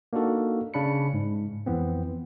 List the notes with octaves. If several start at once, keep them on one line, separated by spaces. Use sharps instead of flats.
A#3 D4 D#4 F#4 A4
C#3 D4 B5 C#7
G#2
F2 E3 B3 C4